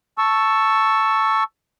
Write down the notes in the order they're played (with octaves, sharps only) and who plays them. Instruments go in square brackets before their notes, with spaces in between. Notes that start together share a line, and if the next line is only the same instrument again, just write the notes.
[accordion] A5 C#6 E6